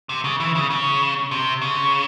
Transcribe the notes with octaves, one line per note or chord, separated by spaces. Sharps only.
C3
C#3
E3
C#3
C#3
C3
C#3